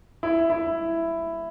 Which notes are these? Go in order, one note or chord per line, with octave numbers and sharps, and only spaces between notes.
E4
E4